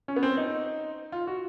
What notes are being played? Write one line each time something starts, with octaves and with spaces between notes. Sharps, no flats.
C#4
B3
C4
D#4
F4
F#4